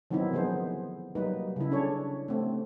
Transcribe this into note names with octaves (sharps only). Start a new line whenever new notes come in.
D#3 F#3 B3 C4 D#4 E4
D3 F3 B3 G#4 C5
F#3 G3 A#3 D#4 B4
C#3 E4
C#4 D4 A4 C#5
A3 C4